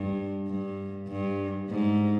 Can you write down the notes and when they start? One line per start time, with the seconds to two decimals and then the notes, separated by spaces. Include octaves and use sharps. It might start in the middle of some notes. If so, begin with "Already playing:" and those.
Already playing: G2
0.47 G2
1.08 G2
1.69 G#2